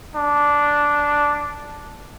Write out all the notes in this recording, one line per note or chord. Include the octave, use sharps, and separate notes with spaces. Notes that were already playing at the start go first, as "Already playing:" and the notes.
D4